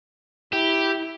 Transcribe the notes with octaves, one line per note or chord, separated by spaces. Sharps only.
E4 G4